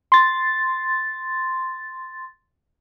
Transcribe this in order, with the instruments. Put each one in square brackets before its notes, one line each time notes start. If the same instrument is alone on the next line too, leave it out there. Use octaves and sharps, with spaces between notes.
[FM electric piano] C6 A6